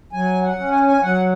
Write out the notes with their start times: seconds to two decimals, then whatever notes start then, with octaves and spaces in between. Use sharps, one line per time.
0.13 F#3 G#5
0.43 F#5
0.57 C#4
0.72 G#5
0.87 G#5
1.02 F#3 F#5